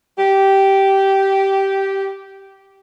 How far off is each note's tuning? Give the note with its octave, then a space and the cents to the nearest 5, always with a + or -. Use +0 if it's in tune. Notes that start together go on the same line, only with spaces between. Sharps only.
G4 -10